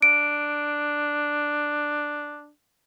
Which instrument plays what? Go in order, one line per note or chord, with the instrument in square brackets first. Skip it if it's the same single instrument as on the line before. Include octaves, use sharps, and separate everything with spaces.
[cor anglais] D4 [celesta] D7